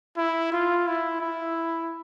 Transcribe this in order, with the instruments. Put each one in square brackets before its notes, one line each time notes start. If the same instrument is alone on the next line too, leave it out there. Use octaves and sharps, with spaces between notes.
[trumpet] E4
F4
E4
E4